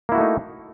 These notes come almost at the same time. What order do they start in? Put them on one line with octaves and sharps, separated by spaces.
A#3 E4 F#4 A3 D#4